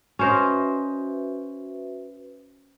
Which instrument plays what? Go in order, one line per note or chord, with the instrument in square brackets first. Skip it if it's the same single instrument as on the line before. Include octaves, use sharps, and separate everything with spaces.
[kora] C#4 C5 D#5 [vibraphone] F#4 B4 E5